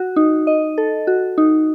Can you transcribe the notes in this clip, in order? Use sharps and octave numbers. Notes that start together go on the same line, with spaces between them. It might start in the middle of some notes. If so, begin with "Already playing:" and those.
Already playing: F#4
D#4
D#5
A4
F#4
D#4